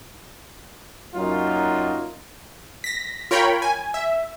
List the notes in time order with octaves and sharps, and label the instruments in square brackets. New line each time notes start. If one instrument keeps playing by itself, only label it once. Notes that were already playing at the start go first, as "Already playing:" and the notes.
[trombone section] F#2 F#3 A#3 D#4 F4
[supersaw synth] A#6 B6
F4 A#4 C#5 G5 B5
G#5
E5